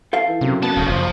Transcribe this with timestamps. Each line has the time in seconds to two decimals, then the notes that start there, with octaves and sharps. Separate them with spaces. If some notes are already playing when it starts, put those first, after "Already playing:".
0.13 A4 E5 F5
0.28 E3
0.41 F#2 C3
0.62 D#2 B3 A5
0.76 D#1 C#3
0.88 F#1 F3